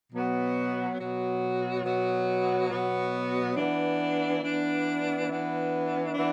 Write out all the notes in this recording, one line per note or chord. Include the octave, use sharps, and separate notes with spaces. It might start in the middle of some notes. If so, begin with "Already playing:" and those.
B2 F#3 B3 F#4
B2 F#3 B3 F#4
B2 F#3 B3 F#4
B2 F#3 B3 F#4
E3 B3 D4
E3 B3 D4
E3 B3 D4
E3 B3 D4